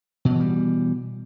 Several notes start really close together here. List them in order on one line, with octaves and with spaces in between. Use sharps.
B2 F#3 E3 G3